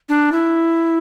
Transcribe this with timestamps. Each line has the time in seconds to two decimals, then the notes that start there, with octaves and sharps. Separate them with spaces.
0.08 D4
0.32 E4